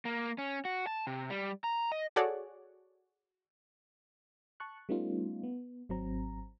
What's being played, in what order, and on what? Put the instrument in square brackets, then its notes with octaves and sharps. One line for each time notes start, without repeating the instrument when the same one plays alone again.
[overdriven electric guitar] A#3
C#4
F#4
A5
C3
G3
A#5
D#5
[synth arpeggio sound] F#4 G#4 A4 C#5 D5 F#5
[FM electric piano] A5 C#6 F#6
G3 A3 B3 C#4 D#4 F4
B3
G#1 F#3 C4 A#5